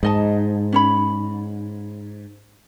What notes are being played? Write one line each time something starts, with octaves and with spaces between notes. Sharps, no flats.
G#2 D#4 D#5 A5
C#4 C#5 B5